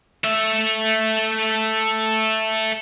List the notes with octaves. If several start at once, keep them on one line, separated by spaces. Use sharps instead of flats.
A4 E5